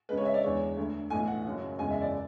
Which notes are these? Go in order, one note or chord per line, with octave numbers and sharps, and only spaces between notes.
C#2 C#3 G#3 B4
C#5
E5
D5
E2 D3 G#3 C#5
D2 D3 A3
B1 A2 E3 A3 G#5
F#5
F#1 F#2 C#3 F#3
F#1 E2 C#3 G#3 G#5
E5
D5